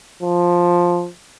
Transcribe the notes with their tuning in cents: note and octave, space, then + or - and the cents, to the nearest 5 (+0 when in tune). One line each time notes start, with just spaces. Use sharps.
F3 +5